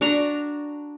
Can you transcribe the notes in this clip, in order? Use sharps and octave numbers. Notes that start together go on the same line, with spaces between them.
D4 F#4 A#5